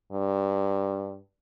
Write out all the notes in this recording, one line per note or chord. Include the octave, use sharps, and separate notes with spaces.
G2